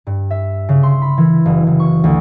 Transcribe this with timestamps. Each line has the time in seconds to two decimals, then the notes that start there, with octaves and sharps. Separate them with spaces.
0.07 G2
0.31 E5
0.69 C#3
0.83 C6
1.02 B5
1.18 E3
1.46 F#1
1.67 F#1
1.80 C#6
2.04 D2